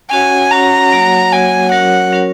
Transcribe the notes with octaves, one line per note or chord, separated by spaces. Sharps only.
C#4 F#4 C#5 F#5 G#5
C#4 F#4 C#5 F#5 A#5
F#3 A#3 F#4 C#5 F#5
F#3 A#3 F#4 C#5 F#5 G#5
F#3 C#4 F#4 A#4 C#5 F#5
F#3 C#4 F#4 A#4 C#5